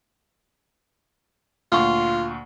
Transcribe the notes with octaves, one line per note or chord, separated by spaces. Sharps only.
D2 A#2 F4 C#6